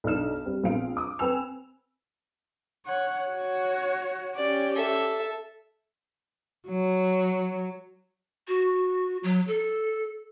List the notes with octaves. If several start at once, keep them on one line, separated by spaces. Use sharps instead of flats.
B1 D4 D#4 F6 E7
G3 C4
A#1 B3 C4 F4 F5 D7
D6 D#6
C4 B4 G5 G#5 E6 F7
C#5 F#5
F#4 C#5
C#4 G4 D5
A4 E5
F#3
F#4
F#3
A4